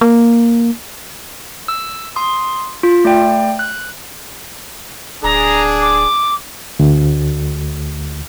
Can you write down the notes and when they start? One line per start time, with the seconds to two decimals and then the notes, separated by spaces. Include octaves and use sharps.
0.01 A#3
1.68 E6
2.16 C6 D#6
2.83 F4
3.05 A3 D5 G5
3.59 F#6
5.23 D1 D4 G#4 A#5
5.81 D6
6.79 D2